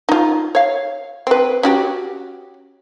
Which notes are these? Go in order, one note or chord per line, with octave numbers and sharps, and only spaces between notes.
D#4 F4
C#5 F5
C4 B4
C#4 F#4 G4